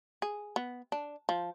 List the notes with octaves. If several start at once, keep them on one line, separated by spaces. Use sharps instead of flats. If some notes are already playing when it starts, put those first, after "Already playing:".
G#4
B3
D4
F3